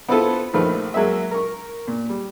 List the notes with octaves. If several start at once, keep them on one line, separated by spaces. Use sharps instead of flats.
B3 C4 E4 F4 A4 B4
A#1 D#3 F3 A3 B4 F6
F#3 G#3 A#3 E5
A#4 C#6
A#2
G3